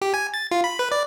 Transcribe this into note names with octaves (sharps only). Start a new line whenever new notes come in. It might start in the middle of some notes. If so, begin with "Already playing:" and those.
G4
G#5
A6
F4
B5
B4
D5